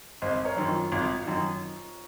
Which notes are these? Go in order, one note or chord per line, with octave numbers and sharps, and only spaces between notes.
G#1 C5 D#5
A#4 C#5
F#2 D#3
F4
G#1
F#2 D#3